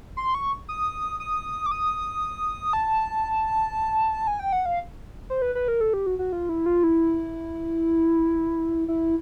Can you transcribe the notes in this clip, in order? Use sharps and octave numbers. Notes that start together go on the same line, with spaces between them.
C6
C#6
D#6
D#6
D6
D#6
A5
G#5
G5
F#5
F5
C5
B4
B4
A#4
A4
G4
F#4
F#4
F4
E4
F4
E4
E4